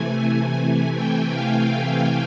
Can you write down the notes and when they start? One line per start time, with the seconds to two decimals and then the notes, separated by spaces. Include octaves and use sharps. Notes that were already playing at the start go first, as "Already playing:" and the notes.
Already playing: C3 E3 A3 G#5
0.58 G#5
0.94 G5
1.31 F5